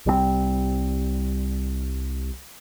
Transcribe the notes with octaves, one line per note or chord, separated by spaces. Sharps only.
C2 G3 G#3 C4